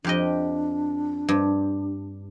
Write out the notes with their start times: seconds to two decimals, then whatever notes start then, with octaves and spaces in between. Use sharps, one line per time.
0.04 F2 D4 G4 D#5
1.29 G2